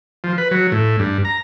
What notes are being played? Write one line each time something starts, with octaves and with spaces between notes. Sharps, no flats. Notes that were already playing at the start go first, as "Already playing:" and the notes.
F3
B4
F#3
A2
G2
A#5